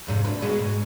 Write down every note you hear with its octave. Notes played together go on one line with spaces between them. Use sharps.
F2 G#2 C3
D2 B4
B2 G#3 B3
G#2